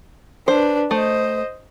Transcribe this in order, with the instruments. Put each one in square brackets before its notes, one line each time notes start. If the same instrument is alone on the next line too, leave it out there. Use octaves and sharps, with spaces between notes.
[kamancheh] D4 B4 [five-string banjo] C5
[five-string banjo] A3 [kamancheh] C5 D#5